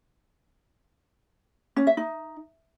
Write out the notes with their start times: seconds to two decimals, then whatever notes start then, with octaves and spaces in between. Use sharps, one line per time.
1.76 C#4
1.87 E5
1.97 D#4